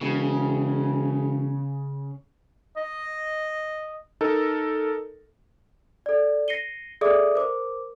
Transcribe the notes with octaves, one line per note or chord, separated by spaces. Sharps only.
E1 C#3
D#5
D#4 A4 A#4
A4 D5
A#6 C7 C#7 D#7 G7
G#4 A4 D5 E5 D6 D#6
A#4 C5 D6